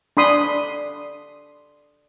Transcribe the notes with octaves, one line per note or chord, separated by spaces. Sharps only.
D4 B5 C6 D#6